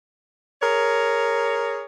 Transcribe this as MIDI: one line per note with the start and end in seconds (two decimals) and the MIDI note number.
0.62 1.85 68
0.62 1.85 70
0.62 1.85 73